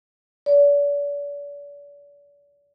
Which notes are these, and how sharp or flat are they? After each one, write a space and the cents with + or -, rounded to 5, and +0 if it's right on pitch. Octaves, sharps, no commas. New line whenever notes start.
D5 -40